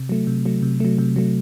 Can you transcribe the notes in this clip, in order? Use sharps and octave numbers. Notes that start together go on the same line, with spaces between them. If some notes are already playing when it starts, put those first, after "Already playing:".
Already playing: C3
F#3 A3
C3
F#3 A3
C3
F#3 A3
C3
F#3 A3